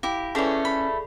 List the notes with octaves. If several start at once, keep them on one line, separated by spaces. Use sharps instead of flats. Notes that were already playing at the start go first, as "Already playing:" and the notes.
E4 G4 F5
E3 A3 C#4 G#4 A4 D5
B5